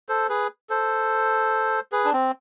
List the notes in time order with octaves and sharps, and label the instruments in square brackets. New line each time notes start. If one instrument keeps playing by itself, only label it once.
[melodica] A4 C5
G#4 B4
A4 C5
G#4 B4
D4
C4